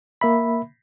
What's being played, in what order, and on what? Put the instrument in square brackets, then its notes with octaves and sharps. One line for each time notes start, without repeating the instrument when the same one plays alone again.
[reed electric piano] A#3 E5 B5